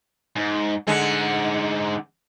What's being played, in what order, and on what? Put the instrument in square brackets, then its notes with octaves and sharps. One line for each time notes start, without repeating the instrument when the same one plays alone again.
[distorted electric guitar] G#2
[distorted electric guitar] G#2 F#5 [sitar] D3 G#3